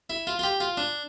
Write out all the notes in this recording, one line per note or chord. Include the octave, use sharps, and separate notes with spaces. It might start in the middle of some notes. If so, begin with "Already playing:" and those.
E4
F4
F4
G4
F4
D4